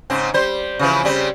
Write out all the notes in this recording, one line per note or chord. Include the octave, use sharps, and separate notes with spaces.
G#2 C#3 C4
G3 C5
C#3 E3 F3
C#3 G3 C4